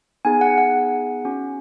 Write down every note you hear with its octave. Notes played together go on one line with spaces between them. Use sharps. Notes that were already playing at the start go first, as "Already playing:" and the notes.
B3 D#4 G#4 G#5
F#5
F#5
C#4 F#4